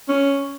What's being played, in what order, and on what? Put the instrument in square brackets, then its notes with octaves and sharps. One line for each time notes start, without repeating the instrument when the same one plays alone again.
[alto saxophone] C#4